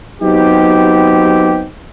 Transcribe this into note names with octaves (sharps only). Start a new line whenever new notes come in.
F#3 B3 C4 D#4 G4